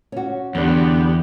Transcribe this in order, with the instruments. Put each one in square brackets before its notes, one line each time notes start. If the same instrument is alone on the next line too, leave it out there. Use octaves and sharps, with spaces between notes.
[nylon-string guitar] C#4 F#4
[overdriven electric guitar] E2 [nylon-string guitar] D3 D4 [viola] B3 G4